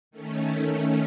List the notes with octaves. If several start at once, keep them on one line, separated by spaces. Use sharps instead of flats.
D#3 A3 C#4